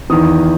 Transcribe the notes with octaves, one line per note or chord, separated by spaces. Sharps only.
E2 D#3 D#6